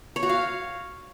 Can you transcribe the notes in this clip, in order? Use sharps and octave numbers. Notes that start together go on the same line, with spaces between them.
C#5
F#4
F5